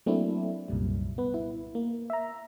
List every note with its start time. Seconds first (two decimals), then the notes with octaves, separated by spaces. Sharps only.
0.06 F#3 A3 A#3 C4 D4 E4
0.68 C2 F#2 A#2 G3
1.18 B3 B4
1.34 E4
1.75 A#3
2.10 E5 A#5